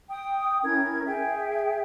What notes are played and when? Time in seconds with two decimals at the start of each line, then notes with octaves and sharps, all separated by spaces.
0.10 G5 D#6
0.64 C#4 E4 A#4 G#6
1.06 G#4 E5 G5